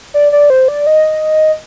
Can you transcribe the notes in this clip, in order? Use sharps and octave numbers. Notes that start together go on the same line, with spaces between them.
D5
D5
C5
D5
D#5